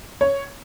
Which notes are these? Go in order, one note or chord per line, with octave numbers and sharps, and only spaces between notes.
C#5